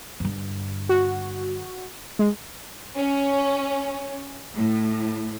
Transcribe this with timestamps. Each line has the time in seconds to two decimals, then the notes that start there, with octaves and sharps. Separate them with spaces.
0.20 G2 D3
0.89 F#4
2.19 G#3
2.96 C#4
4.55 A2